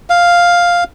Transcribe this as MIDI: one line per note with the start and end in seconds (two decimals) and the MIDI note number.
0.10 0.84 77